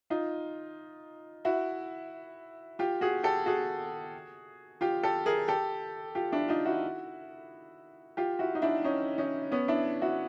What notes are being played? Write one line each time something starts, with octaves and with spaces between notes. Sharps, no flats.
D#4 F4
E4 F#4
F4 G4
F#4 G#4
G4 A4
F#4 G#4
F4 G4
G4 A4
G#4 A#4
G4 A4
F4 G4
D4 E4
D#4 F4
E4 F#4
F4 G4
E4 F#4
D#4
D4 E4
C#4 D#4
C#4 D#4
B3 C#4
D4 E4
E4 F#4